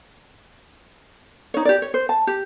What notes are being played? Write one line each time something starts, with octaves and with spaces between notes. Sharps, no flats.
D#4 C#5
G4 D5
C#5
C5
A5
G4